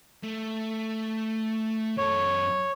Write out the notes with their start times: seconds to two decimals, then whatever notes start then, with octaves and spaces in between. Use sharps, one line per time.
0.23 A3
1.98 F#2 A4 C#5